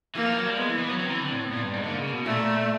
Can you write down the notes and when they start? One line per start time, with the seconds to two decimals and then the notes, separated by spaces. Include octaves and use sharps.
0.15 E3 A#3
0.26 F3
0.36 F#3
0.47 G3
0.57 G#3 B3
0.68 E3
0.79 E3
0.89 F#3
0.99 F#3 C4
1.06 D#3
1.10 E3
1.20 D3
1.31 A2
1.42 B3
1.52 A#2
1.63 G2
1.73 G#2
1.83 D3 A#3
1.98 C#3
2.12 B2
2.26 A#2 A3